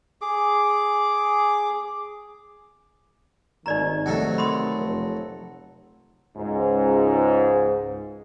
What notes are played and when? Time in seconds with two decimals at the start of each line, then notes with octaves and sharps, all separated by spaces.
0.21 G#4 D6
3.66 G#1 D#3 D#4 D5 A#5
4.06 C3 F#3 A3
4.38 B5 C6 D#6
4.77 F1
6.36 C#2 G#2